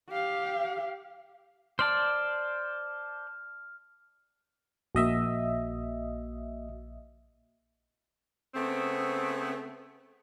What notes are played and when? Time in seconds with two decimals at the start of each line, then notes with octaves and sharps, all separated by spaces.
0.11 G4 F5
1.79 C5 D5 A5 F6
4.95 A#1 A#3 F#4 D#5 E5
8.54 C#3 A3 B3 C4